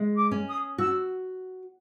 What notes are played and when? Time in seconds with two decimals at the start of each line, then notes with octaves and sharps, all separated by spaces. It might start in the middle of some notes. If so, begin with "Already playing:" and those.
Already playing: G#3
0.16 D6
0.31 C#4
0.48 D#6
0.78 F#4 E6